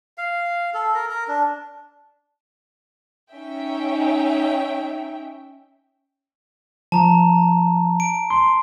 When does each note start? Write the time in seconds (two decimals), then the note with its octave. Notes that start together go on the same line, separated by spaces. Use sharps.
0.18 F5
0.74 A4
0.95 A#4
1.09 A#4
1.28 D4
3.31 C#4 D#4 E5 G5
6.92 F3 A5 A#5
8.00 D7
8.30 C6